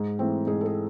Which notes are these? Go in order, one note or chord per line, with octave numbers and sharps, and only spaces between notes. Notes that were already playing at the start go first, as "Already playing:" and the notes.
Already playing: G#2 G#4
E3 A3 C4
G#2 G#4
A4
G#4